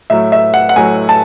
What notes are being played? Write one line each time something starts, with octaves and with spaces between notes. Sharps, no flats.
A2 F#3 E5
E5
F#5
F#5
A2 F#3 G#5
A5